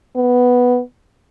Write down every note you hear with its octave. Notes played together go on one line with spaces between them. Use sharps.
B3